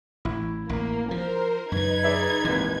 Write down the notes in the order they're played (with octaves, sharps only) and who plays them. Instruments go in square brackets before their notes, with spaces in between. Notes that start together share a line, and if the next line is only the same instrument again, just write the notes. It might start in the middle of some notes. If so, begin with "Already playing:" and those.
[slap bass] A1 [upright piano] E4
[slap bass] A1 [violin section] A#3
[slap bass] F3 [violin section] A#4 C5
[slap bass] F#2 C#3 [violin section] D#4 B4 G#6
[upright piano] G#4 D5 E5
[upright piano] D#1 G#1 [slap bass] E3